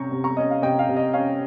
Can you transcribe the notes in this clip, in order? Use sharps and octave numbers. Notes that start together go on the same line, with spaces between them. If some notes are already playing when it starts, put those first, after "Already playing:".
Already playing: C3 C#4 A#5 C#6
C3
A#5 C#6
C#4 D#5
F5
C3 D#5 G5
F5
C3
D#5
C#4 F5